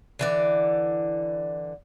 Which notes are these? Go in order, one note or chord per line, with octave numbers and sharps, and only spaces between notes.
D3 E3 D5